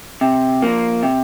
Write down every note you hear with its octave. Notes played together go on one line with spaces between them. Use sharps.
C3
F3 A#3
C3